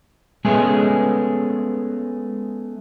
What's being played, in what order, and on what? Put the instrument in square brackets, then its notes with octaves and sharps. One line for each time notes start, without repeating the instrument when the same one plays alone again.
[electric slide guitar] G#3 A3 B3 C#4 G#4